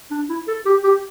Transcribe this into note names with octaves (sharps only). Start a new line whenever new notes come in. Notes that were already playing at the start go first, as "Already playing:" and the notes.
D4
E4
A4
G4
G4